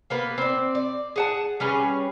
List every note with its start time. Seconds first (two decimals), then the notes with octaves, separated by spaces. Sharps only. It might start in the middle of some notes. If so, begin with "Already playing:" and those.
0.10 A#3 B3 B4
0.38 C4 D5
0.75 D5
1.16 G#4 F#5 A5
1.60 G3 C#4 G#4 B4